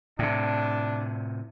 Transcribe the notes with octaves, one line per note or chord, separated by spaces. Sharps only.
A2 C3 D4